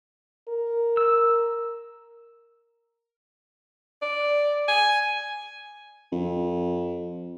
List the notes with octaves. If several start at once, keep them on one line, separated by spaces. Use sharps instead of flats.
A#4
E6
D5
G#5
F2